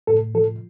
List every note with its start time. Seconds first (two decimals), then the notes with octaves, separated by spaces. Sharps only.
0.07 A2 A4
0.34 F3 A4